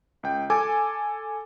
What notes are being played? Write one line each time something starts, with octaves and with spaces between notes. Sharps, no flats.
C#2 G5
A4 G#5 D6